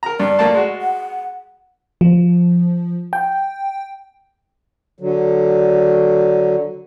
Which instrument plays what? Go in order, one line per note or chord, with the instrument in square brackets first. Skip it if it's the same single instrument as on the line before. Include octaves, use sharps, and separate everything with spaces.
[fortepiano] A#4 A#5
[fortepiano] G2 [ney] D5
[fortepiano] A3 A#3 A5
G#3 F#4
[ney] F#5
[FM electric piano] F3
G5
[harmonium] D3 F#3